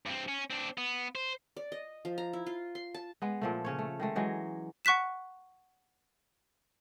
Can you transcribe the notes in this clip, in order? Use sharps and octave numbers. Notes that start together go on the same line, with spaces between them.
G2 C4
C#4
C4 D4
B3
C5
D5
D#5
F3
A#5
E4
F4
C6
A5
G#3 B3
A#2 F3 A3
C#3 C#4 C#5
A3
D#3 G#3 A3
E3 F#3 G#3 D#4
F#5 C#6 F#6 B6 E7